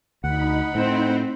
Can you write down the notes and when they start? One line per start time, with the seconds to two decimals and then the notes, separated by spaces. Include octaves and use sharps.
0.24 D2 D#4 F#5 B5
0.75 A2 C4 C5